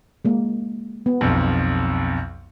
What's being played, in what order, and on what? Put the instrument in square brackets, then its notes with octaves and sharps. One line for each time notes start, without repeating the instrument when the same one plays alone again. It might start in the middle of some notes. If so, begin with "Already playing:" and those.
[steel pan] G#3 A#3
B3
[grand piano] B1 F2